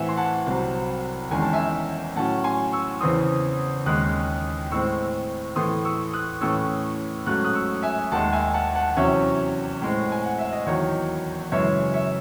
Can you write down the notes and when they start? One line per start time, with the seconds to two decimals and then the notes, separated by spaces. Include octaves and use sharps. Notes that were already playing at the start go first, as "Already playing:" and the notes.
Already playing: A2 E3 C4 E5 F#5 G#5
0.09 C6
0.17 F#5 A5
0.46 C2 C3 F#3 C4
1.31 E2 D#3 G#3 C#4 G#5
1.42 A5
1.53 E5 G#5
2.16 A2 F#3 C#4 F#5 A5
2.44 G#5 C6
2.72 C#6 E6
3.01 E2 C#3 E3 C4 C6 D#6
3.86 D#2 D#3 G#3 C#4 D#6 F#6
4.72 A2 G#3 C4 C#6 E6
5.56 A2 E3 A3 C6 D#6
5.85 C#6 E6
6.13 D#6 F#6
6.41 A2 E3 A3 C#4 C#6 E6
7.26 G#2 F#3 A3 C#4 F#6
7.44 D#6 F#6
7.55 C#6 E6
7.83 E5 G#5
8.12 D#2 D#3 G#3 F#5 A5
8.33 E5 G#5
8.53 F#5 A5
8.75 F#5 A5
8.96 E2 C3 F#3 C#4 C#5 E5
9.82 A2 G#3 C4
10.12 G#5
10.25 F#5
10.39 E5
10.53 D#5
10.66 E2 D#3 F#3 C#5
11.52 F#2 C#3 E3 G#3 C#5 E5
11.94 C#5 E5